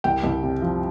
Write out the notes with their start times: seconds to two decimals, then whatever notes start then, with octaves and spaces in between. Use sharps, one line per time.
0.04 C2 G5
0.24 C2
0.43 C3
0.62 F3